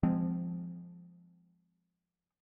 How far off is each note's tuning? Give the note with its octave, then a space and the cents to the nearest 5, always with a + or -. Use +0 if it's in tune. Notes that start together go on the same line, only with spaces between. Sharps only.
F3 +0 G#3 -15 C4 -20